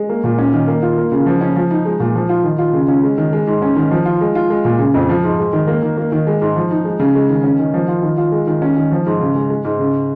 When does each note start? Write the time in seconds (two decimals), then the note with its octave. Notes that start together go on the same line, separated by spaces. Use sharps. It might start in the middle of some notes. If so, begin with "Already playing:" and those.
Already playing: G#3
0.09 A#3
0.24 A#2
0.38 C#4
0.53 D#3
0.68 A#3
0.82 F4
0.98 A#3
1.12 C#3
1.26 F3
1.41 C#4
1.56 F3
1.71 D#4
1.85 G#3
2.00 A#2
2.15 F3
2.29 F4
2.44 D#3
2.58 F4
2.73 C#3
2.88 C#4
3.03 G#3
3.18 D#3
3.33 G#3
3.47 G#2
3.62 C#4
3.76 D#3
3.91 F3
4.05 F4
4.21 G#3
4.35 F4
4.50 G#3
4.65 A#2
4.79 C#3
4.94 F2
5.09 F3
5.24 G#2
5.39 G#3
5.53 D#3
5.67 A#3
5.82 D#3
5.97 A#3
6.12 D#3
6.27 G#3
6.42 G#2
6.56 F3
6.71 D#4
6.85 G#3
7.00 C#3
7.15 G#3
7.30 D#3
7.44 C#4
7.59 D#3
7.74 F3
7.88 F4
8.03 D#3
8.17 F4
8.32 G#3
8.47 D#3
8.62 C#4
8.77 D#3
8.92 F3
9.06 G#2
9.21 C#3
9.35 G#3
9.50 G#3
9.65 G#2
9.79 C#3